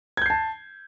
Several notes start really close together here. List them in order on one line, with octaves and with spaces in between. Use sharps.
G#6 G6 C7 A5